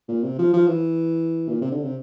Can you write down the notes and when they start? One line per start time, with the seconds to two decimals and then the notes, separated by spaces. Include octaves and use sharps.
0.08 A#2
0.23 C3
0.38 F3
0.53 F3
0.67 E3
1.49 A#2
1.61 C3
1.72 D3
1.84 C3